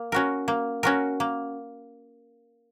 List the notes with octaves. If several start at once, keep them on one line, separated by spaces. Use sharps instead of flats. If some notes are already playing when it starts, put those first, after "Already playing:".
Already playing: A#3
C#4 F#4 A#4
A#3
C#4 F#4 A#4
A#3